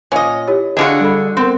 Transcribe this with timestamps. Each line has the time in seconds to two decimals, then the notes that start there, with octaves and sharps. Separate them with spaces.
0.12 A#2 C#4 D#5
0.48 E4 G4 C#5
0.77 D3 D4 F4 F#4 G#4 D#5
1.00 G3 A4 B5
1.37 B3 C4 A#4